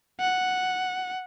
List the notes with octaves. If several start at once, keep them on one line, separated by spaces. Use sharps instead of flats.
F#5